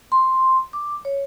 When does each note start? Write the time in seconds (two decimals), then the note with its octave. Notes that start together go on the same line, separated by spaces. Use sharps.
0.12 C6
0.73 D6
1.05 C#5